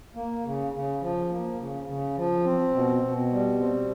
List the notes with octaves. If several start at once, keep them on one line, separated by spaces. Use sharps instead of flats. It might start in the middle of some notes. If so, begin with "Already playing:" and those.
A#3
C#3
C#3
F3
A#3
C#3
C#3
F3
C4
B2
B2
G3
C4